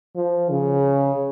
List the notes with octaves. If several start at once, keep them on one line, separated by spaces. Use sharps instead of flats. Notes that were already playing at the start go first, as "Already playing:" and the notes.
F3
C#3